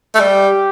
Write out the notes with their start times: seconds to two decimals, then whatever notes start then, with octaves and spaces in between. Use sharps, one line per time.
0.15 A3
0.20 G3 G4